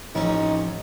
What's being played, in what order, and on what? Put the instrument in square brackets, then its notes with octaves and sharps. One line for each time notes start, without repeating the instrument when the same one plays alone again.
[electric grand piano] A1 [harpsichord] F2 C#4 [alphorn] D#4